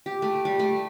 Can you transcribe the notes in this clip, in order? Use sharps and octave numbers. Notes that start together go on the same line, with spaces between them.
G4
A3
G3
A3